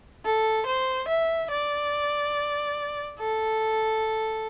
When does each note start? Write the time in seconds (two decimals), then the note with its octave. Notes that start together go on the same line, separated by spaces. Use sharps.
0.25 A4
0.66 C5
1.08 E5
1.51 D5
3.19 A4